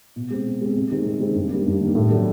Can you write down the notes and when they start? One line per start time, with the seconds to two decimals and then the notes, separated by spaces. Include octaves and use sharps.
0.16 B2
0.30 G#3 C4
0.46 B2
0.61 G#3 C4
0.76 C3
0.90 D#3 G#3 C4
1.06 C3
1.21 D#3 G#3 C4
1.35 G2
1.50 D#3 G3 A#3
1.66 G2
1.80 D#3 G3 A#3
1.95 A2
2.11 F#3 A3 D4